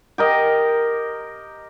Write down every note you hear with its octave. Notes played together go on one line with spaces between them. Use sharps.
G4 A#4 D#5